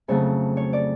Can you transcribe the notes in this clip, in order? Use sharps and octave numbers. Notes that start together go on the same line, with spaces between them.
F2 C#3 F#3 A3 C#4 C#5
C#5
D5